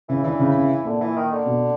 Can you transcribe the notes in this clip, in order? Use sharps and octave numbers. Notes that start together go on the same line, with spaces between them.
C#3 E3
D3 E3
C#3
C#3
A#2 D3
E3
D#3
D3
B2